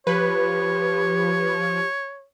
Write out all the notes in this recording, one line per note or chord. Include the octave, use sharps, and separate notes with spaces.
F3 G4 B4 C#5